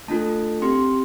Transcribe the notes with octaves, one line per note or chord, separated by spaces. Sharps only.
A3 D4 F4 A4 A5
C4 G4 C6